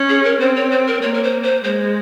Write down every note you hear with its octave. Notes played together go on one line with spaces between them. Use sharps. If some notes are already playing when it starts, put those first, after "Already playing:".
Already playing: C#4
G#4
A#4
C4 C5
C#5
C5
A#4
A#3 C#5
A#4
C5
C5
G#3 C5